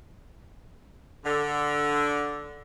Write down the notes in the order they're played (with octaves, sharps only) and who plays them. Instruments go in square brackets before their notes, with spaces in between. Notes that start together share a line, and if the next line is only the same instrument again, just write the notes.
[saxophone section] D3